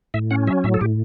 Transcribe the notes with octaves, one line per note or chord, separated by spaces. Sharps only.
A2 E5
C#4 F#5
F#3 E5
A2 E5
A4
A2 G4